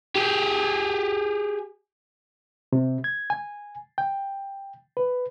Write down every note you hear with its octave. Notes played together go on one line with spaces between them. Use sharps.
G4 G#4
C3
G#6
G#5
G5
B4